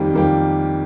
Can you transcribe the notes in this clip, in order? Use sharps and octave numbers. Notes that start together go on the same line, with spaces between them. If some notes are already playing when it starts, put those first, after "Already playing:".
Already playing: F2 D#3 G3 A#3 G4
F2 D#3 G3 A#3 G4